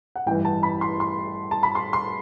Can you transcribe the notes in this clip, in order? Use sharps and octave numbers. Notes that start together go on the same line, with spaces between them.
F#5
A1 G2 E3 G5
A5
B5
C6
C6
A5
B5
C6
C6